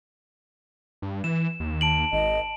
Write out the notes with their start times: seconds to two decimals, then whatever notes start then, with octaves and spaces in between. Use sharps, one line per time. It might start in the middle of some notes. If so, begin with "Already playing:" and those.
1.02 G2
1.24 E3 E7
1.60 D#2
1.81 A5 D7 F#7
2.13 G#1 D#5